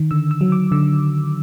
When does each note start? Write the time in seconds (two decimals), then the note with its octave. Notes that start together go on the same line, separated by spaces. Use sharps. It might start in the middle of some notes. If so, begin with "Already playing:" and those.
Already playing: D#3
0.11 D3 E6
0.31 E6
0.41 F#3
0.52 D6
0.72 D3 E6